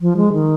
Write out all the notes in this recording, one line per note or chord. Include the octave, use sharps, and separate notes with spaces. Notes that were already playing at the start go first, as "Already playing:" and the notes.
F3
G#3
D#3